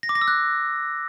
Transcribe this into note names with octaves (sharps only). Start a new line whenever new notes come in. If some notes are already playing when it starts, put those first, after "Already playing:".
A#6
D6
A#6
E6
F#6